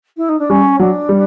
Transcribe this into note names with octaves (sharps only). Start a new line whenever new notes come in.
E4
D#4
D4
G3 C#4
F#3 D4
G3